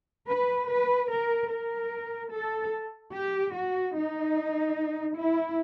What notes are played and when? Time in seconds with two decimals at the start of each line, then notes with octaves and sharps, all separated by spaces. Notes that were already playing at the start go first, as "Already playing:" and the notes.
0.28 B4
0.69 B4
1.10 A#4
1.50 A#4
2.32 A4
3.13 G4
3.53 F#4
3.94 D#4
5.16 E4